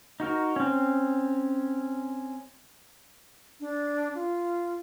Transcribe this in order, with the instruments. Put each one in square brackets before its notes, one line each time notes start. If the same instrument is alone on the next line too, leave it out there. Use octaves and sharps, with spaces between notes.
[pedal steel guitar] D#4 F#4 A#4
C4 C#4
[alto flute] D4
F4